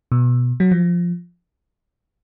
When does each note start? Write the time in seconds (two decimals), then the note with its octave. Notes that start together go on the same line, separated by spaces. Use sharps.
0.12 B2
0.60 F#3
0.71 F3